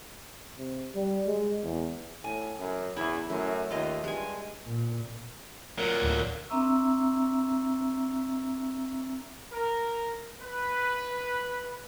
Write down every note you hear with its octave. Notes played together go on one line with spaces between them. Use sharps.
C3
G3
G#3
E2
A2 G#5
F#2
E2 E4 E5
F#2 A3
D#2 F4 D#5
G2 G#3 G#5
A#2
A#2 F#3 A#4
D2 A2
C4 D4 E5 A#5 C#6 E6
A#4
B4